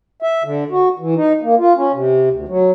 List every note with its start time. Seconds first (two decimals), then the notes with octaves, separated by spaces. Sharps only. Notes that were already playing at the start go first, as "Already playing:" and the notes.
0.22 E5
0.44 D3
0.71 F#4
0.99 E3
1.16 D#4
1.42 A#3
1.58 F4
1.76 C#4
1.93 C3
2.31 D2
2.48 F#3